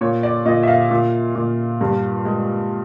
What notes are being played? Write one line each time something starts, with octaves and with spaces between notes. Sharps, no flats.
A#2 C#5
D5
A#2 D#5
E5
F5
A#2
A#2
G2
G#3